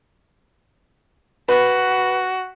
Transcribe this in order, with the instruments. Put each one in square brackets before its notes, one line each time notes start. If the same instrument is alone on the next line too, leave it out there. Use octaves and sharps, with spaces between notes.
[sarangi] F#4 [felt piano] B4